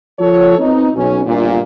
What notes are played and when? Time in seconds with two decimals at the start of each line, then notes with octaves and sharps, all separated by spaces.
0.19 F3 F4 A4 C#5
0.59 B3 C4 D#4
0.94 B1 C#4
1.26 G1 A#2